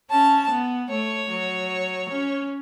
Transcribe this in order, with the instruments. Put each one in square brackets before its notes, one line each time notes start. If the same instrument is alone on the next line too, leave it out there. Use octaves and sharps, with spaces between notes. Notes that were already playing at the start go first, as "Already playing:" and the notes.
[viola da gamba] C#4 [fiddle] A5
[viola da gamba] B3
[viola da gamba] A3 [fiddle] C#5
[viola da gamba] F#3
C#4